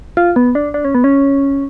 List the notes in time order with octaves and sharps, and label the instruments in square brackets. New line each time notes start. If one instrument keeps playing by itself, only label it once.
[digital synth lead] F4
B3
D4
D4
C#4
B3
C#4